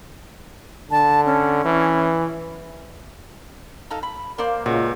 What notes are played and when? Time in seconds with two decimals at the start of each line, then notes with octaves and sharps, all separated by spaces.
0.91 D3 A5
1.26 C#4
1.66 E3
3.90 D#4 A4 F5
4.03 B5
4.38 A#3 C5 D5 D6
4.66 C#2 A#2 F#4